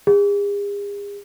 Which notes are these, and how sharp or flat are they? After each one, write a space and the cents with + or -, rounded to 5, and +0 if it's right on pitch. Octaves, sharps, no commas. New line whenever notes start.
G#4 -45